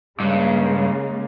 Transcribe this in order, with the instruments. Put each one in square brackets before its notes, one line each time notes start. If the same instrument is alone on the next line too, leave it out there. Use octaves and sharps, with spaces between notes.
[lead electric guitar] G2 [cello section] C#3 G#3 A#3